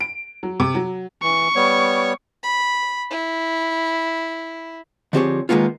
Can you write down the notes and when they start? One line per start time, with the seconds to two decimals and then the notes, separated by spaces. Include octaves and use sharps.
0.01 D7
0.43 F#3
0.60 C3
0.75 F#3
1.23 E3 C#6
1.56 G3 B3 C#5
2.43 B5
3.11 E4
5.13 D3 F3 C4 G4 G#4 C#5
5.49 D#3 F3 G#3 A#3 B3 F4